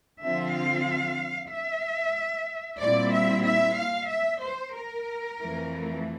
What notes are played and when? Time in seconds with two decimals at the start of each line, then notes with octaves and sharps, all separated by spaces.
0.20 D3 F3 C4 F4 E5
0.53 F5
1.50 E5
2.80 A#2 G3 C4 E4 D5
3.13 E5
3.45 E5
3.78 F5
4.10 E5
4.43 C5
4.75 A#4
5.40 F2 E3 A3